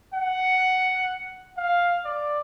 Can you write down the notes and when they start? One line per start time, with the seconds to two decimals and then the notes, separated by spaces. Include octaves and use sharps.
0.14 F#5
1.57 F5
2.05 D5